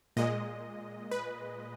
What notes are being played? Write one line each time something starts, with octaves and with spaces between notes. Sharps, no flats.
A#2 G#3 D#5
B4